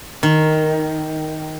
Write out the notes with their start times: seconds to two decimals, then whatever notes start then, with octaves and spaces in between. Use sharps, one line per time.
0.23 D#3